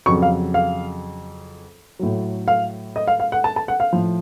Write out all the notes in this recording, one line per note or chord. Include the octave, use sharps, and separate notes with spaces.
F2 C#3 F#3 C#6
F5
F5
A2 F#3
F5
D#5
F5
F5
F#5
A5
A5
F#5
F5
A2 F3